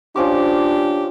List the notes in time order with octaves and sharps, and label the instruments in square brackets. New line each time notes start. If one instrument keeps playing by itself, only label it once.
[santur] F3 C#4 D6 [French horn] D4 [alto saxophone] G4